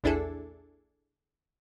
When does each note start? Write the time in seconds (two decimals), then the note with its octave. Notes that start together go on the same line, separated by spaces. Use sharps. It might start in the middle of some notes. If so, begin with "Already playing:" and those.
0.04 A#1 E2 D4 E4 G#4 A4